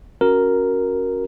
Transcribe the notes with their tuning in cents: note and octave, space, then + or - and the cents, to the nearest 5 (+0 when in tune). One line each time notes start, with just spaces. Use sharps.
C#4 +0 F#4 +0 A#4 +0